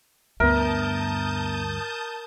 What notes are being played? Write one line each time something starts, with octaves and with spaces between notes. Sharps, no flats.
D2 G2 B3 A#4 E5 A5 D#6 G6